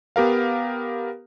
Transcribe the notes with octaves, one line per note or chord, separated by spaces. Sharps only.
B3 G4 A#4 F5